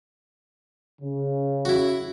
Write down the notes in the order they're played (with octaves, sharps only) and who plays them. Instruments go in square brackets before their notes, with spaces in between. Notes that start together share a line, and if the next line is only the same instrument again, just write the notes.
[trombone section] C#3
[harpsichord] E4 F#4